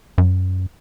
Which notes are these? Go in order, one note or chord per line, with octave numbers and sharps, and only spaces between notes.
F#2